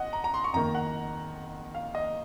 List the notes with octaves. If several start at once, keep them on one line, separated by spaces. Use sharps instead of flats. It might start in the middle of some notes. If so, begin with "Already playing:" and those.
Already playing: D#5 F#5
A#5
A#5
C6
C#6
F2 D#3 A#3 A#5
F#5
F5
D#5